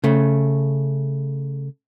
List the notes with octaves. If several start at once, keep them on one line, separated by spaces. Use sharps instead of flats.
C#3 A3